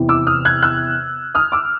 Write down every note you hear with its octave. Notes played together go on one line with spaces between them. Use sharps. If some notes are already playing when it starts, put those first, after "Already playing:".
Already playing: E2 C3 E3
D6 E6
D#6 F6
F#6 G#6
E6 F#6
D#6 F6
D6 E6